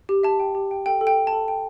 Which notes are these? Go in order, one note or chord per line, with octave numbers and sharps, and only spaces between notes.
G4
E5 A5
G5
G4
G5
A4 G5
A4
G5
A4
A5
A4
G5